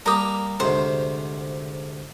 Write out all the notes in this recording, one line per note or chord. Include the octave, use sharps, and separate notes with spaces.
G3 A#3 G4 A#5 D#6
D2 G#2 C3 C5